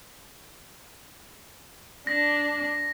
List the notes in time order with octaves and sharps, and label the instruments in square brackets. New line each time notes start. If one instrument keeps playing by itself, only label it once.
[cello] D4 [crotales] A#6